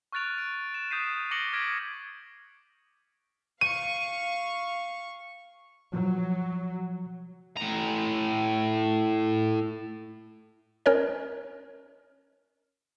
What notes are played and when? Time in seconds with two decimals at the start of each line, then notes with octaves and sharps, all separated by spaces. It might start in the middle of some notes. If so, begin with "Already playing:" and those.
0.12 C#6 F6 F#6 A6 D7 F7
0.38 D7
0.74 E7
0.91 D#6 G6 B6 C7 D#7
1.31 D6 A#6 C#7 D7 F#7 G7
1.53 D6 F6 G#6 A#6 B6 D7
3.61 F5 C#6 D#7
5.94 F3 F#3
7.57 A2 A#5
10.86 C#4 A#4 C#5 D#5